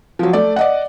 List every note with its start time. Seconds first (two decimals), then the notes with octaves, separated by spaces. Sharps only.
0.19 F3 F#3
0.33 A3 D5
0.56 D5 D#5 F#5